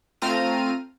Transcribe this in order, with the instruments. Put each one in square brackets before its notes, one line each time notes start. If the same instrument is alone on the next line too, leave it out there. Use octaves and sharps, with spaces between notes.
[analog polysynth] A3 C4 F4 A#5 F6 D#7